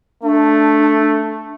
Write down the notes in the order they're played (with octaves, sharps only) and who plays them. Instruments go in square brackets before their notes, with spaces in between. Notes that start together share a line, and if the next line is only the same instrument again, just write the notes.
[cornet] A3 [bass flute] D4